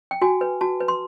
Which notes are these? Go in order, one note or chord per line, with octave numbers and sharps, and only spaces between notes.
G5
F#4 G#5
B4
F#4 A5
B4
C6